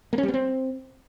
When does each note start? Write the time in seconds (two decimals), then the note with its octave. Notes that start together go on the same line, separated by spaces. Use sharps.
0.13 A#3
0.18 C#4
0.23 G3
0.28 B3
0.34 C4